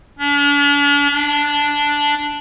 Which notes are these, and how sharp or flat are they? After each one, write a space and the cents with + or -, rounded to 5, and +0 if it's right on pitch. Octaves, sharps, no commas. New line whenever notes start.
D4 -45
D4 -5